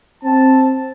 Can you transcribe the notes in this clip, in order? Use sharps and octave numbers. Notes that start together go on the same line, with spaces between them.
C4 A5